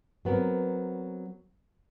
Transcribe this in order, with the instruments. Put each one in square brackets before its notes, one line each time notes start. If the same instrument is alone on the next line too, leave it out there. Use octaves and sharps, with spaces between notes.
[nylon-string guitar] F#3 B3 C4 A#4